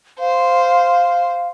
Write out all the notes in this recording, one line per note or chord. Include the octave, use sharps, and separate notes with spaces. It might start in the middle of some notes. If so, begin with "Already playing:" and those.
C5 F5